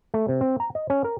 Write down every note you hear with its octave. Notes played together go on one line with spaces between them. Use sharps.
A3
C3
C4
A#5
D#5
C#4
A#4